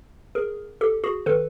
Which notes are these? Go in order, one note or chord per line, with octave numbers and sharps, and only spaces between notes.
G#4 A#4
G4 A4
F#4 G#4
D#3 A4 B4